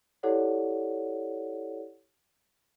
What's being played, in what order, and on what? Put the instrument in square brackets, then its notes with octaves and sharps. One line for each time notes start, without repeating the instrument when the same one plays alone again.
[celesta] E4 G4 A4 C#5 D5 F#5